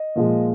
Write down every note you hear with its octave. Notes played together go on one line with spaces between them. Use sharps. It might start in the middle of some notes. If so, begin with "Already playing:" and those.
Already playing: D#5
A#2 F3 G#3